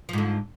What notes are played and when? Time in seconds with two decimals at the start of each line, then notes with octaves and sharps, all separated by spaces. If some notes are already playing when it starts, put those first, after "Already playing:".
0.09 F3
0.13 G#2
0.18 D3